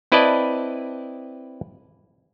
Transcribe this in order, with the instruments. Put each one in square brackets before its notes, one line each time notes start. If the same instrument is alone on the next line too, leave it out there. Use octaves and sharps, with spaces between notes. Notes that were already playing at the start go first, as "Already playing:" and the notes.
[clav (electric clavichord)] C4 E4 B4 D5 D#5 A5